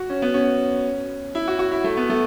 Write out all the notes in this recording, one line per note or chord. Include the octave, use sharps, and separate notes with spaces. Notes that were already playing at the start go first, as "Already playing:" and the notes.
Already playing: F#4
C#4
B3
C#4
E4
F#4
F#4
E4
A3
B3
A3